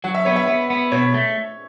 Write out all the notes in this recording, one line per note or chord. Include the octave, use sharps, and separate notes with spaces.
F#3 F#5
E5
B3 C#5
E5
B3
B3
B2 C#5
A3